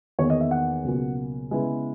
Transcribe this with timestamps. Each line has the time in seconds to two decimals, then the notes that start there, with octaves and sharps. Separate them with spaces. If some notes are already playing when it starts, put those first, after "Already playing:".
0.19 E2 D#3 A#3 C#5
0.30 D#5
0.40 E5
0.51 F#5
0.84 C#2 B2 F#3 A#3 C#4
1.51 C#3 G#3 B3 E4